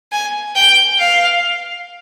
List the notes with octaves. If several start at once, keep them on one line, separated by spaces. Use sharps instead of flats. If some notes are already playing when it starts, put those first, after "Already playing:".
G#5
G5
F5